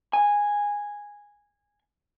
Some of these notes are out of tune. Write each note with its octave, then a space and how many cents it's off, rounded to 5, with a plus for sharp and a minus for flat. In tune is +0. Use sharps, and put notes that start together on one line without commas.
G#5 -10